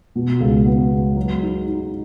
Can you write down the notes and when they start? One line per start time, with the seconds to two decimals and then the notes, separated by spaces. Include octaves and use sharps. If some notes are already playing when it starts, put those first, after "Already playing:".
0.16 B2
0.40 C#2
0.66 B3
0.91 G#3
1.16 F#3
1.42 D#4
1.67 D#4